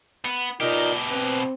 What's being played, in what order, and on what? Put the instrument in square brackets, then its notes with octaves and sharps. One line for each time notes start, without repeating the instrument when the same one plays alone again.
[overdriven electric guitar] B3
[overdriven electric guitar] B2 G4 [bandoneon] D#4 A#4 [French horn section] F4 D5
[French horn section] C4 [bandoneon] B4